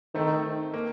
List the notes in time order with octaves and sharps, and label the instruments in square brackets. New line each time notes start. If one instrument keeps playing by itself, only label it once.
[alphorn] D#3 [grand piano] A3 C4
[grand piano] A#3